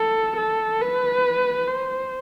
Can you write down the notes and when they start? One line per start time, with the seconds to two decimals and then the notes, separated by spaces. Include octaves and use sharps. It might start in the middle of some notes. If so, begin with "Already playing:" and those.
Already playing: A4
0.37 A4
0.81 B4
1.68 C5